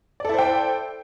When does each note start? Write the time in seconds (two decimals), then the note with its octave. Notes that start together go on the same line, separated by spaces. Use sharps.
0.20 D5
0.25 A4
0.29 E4
0.34 C5
0.39 G5